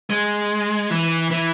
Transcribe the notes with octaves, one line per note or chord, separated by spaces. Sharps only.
G#3
E3
E3